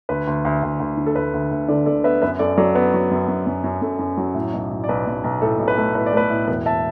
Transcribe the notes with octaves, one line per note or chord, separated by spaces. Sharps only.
D2 B4
D2
D2
D2
D2
D3
A4
D2 B4
D2
D2
D3 A4 D5
D3 A4 D5
B3 B4 E5
F#2 B4 E5
F#2 A4 D5
F#3 A4 D5
B3 B4
F#3
F#2
F#2
F#2
F#2
F#2 A4
F#2
F#3
A2
B1
A2
D5
B1 B4
B1
B1
A2 A4
B1
B4
A3
A2 B4
D5
A3 B4
A2
E1 B4
E5 A5